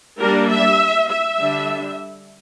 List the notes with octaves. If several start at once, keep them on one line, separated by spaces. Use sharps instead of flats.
G3 A#3 D4 A#4
E5
E5
D3 G3 D4